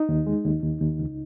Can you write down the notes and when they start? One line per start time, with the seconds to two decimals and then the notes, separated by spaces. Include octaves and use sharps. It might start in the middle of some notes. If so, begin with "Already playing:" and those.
Already playing: D#4
0.09 D#2
0.27 G#3
0.45 D#2
0.63 D#2
0.81 D#2
1.00 C#2